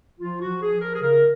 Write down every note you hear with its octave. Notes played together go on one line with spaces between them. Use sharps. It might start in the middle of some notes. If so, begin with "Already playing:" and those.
F3 F4
F#4
F3
G#4
F3
A#4
G#4
C#3 A#4